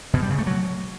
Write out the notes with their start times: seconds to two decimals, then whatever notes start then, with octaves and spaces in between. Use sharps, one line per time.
0.13 B2
0.22 G3
0.30 C#3
0.38 A3
0.47 F#3